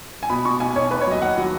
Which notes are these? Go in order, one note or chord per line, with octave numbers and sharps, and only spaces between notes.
G#5
B2 B5
B2 C#6
B1 G#5
B1 C#5
D#2 B4
C#5
F#3 D#5
D#3 F#5
F#3